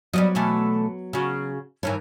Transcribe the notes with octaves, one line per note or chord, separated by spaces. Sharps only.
F#3 G3 B3 D5 D#5
B2 E3 A3
C#3 F#4
G2 D#3 E3 C#5